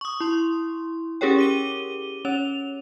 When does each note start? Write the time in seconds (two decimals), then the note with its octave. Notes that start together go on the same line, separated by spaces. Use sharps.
0.01 C#6 D#6
0.20 E4 C6
1.21 C#4 G4 G#4 A#4 C#5 G5
1.39 D6 D#7 G7
2.25 C#4 C#5 F7